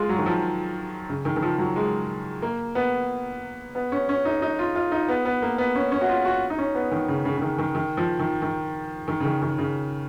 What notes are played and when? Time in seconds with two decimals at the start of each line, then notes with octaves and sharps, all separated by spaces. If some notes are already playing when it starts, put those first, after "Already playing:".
Already playing: G#3 F4
0.09 F#3
0.18 D#3
0.26 F3
1.09 C#3
1.25 D#3
1.36 D#3
1.42 F3
1.59 F#3
1.76 G#3
2.42 A#3
2.75 B3
3.75 B3
3.92 C#4
4.09 C#4
4.25 D#4
4.42 D#4
4.59 F4
4.75 F4
4.92 D#4
5.09 B3
5.25 B3
5.42 A#3
5.58 B3
5.75 C#4
5.92 C#4
6.01 F#4
6.09 F4
6.25 F#4
6.50 D#4
6.58 C#4
6.75 B3
6.92 D#3
7.08 C#3
7.25 C#3
7.37 C#3
7.42 D#3
7.59 D#3
7.75 D#3
7.97 F3
8.19 D#3
8.42 D#3
9.08 D#3
9.20 C#3
9.25 D#3
9.42 D#3
9.58 C#3